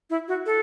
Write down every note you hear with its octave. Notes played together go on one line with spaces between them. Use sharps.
E4
F#4
A4